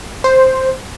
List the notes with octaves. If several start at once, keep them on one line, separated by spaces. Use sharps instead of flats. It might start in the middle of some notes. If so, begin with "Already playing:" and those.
C5